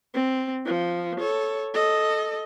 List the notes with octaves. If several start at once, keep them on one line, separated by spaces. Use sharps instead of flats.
C4
F3
A4 C#5
A4 D#5